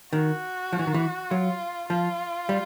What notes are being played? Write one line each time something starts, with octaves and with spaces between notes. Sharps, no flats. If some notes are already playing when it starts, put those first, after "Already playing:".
D#3 F#4
F3
E3
D#3
E3
F#3 F4
F3 F4
G3